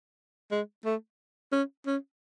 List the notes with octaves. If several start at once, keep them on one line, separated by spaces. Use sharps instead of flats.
G#3
A3
C#4
C#4